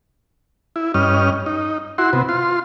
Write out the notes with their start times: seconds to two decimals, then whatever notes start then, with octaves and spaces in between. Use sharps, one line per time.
0.76 E4
0.94 G2 C#4 D#5 F6
1.46 D#4
1.98 E4 F#4 C6
2.13 C3 B3
2.29 F4 C6